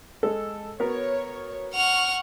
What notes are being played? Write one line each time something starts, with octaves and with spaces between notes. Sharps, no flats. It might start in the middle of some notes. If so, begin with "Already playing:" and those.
G#3 A4
B3 F#4 A#4 C#5
F#5 C#6 F6 F7